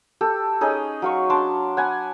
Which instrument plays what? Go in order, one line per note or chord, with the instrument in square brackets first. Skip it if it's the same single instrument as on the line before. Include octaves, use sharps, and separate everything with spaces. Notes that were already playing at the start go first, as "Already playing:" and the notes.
[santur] G4 A4
C#4 D#4 G#4 D#5
F#3 F5 C#6
D4 A5 C6 D6
F#5 G#5 B5